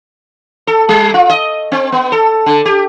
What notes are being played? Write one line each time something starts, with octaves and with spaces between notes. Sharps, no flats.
A4
G3
F4
D#5
C4
B3
A4
D3
G4